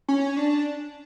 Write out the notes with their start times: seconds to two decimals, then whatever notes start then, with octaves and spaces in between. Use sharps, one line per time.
0.09 C#4
0.37 D4